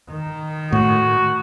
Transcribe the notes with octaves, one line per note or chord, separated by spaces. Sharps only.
D#3
A2 F#4